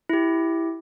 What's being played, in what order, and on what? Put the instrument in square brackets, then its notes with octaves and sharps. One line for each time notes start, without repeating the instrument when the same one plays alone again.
[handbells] E4 G4